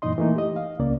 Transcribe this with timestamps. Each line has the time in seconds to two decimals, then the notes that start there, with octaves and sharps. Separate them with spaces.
0.02 F#2 A#2 E3 D#4 D#5 C6
0.18 E3 A3 A#3 D#4
0.36 G4 D#5
0.56 F5
0.79 C#2 C#3 A#3 D5